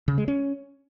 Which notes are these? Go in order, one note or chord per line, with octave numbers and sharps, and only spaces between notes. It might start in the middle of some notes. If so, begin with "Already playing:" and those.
C#3
G#3
C#4